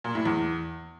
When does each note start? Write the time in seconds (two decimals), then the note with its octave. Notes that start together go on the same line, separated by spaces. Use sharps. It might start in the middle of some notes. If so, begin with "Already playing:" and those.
0.04 A#2
0.15 A2
0.25 E2